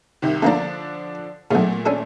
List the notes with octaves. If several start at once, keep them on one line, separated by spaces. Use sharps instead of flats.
C2 C3 D#3
D3 F3 A3 A#3 D4 A#5
B1 A#2 C#3 A3
C#4 D4 A4